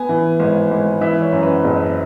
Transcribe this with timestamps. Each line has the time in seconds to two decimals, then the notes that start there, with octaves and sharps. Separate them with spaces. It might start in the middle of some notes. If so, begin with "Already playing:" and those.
Already playing: B3 G#5
0.09 E3
0.40 G#1
0.71 G#1
1.01 E3 E5
1.22 C#5
1.33 F#2
1.43 B4
1.64 F#1